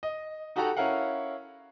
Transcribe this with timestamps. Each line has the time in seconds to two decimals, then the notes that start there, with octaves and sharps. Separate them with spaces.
0.03 D#5
0.56 D#4 F#4 G4 A4 F#5 A#5
0.77 C#4 E4 A#4 F5 F#5